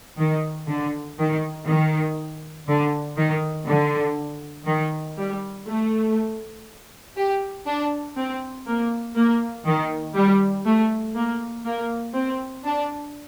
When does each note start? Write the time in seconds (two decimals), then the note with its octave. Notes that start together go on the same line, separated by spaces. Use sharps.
0.19 D#3
0.68 D3
1.18 D#3
1.68 D#3
2.68 D3
3.18 D#3
3.68 D3
4.67 D#3
5.17 G3
5.67 A3
7.17 G4
7.66 D4
8.17 C4
8.66 A#3
9.16 A#3
9.66 D#3
10.16 G3
10.66 A3
11.16 A#3
11.66 A#3
12.15 C4
12.65 D4